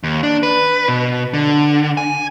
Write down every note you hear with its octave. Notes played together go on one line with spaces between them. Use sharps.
D#2
D4
B4
B2
D3
G#5